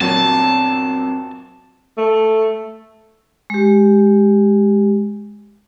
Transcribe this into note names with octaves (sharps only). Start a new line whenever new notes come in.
G1 A#2 F#3 C4 A5
A3
G#3 G4